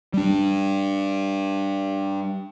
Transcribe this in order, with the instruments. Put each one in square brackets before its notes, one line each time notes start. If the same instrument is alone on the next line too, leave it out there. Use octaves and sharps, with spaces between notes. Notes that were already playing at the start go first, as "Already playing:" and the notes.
[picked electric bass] G3 D4